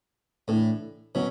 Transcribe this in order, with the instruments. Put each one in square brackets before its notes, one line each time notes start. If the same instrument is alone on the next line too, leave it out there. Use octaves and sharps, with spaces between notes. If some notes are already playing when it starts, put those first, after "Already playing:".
[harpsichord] A2 [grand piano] E3 A3 D4 A4
[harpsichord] B2 [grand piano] F#3 C#4